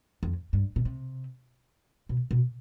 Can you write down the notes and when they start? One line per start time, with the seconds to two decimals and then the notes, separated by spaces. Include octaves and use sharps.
0.23 F2
0.53 G2
0.76 B2
0.85 C3
2.09 B2
2.31 B2